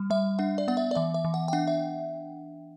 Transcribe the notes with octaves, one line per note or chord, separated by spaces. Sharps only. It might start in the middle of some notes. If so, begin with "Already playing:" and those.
Already playing: G3
G3 E5
D4 F#5
D5
B3 F#5
E5
D5
E3 E5
E5
E3
F#5
G5
D4 F#5
E5